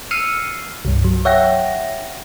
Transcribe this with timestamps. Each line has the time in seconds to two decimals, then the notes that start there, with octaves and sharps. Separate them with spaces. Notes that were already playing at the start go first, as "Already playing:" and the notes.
0.11 E6 F6 C7 C#7 D#7
0.85 C2 G2
1.04 F#3
1.25 C#5 E5 F#5 G5 A#6